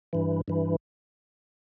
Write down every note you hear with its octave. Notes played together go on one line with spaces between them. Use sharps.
G2 E3
G2 E3